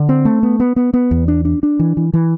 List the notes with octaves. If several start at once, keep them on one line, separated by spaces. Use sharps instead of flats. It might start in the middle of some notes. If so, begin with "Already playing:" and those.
Already playing: D3
C4
A3
B3
B3
B3
B3
E2
D4
D4
D4
E3
E3
E3